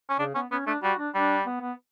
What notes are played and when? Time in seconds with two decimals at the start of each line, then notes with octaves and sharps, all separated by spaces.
0.09 C#4
0.19 C#3 D4
0.35 B3 C#4
0.51 B3 C#4
0.66 A3 D4
0.83 G3 F#4
0.98 D4
1.14 G3 D4
1.45 B3
1.61 B3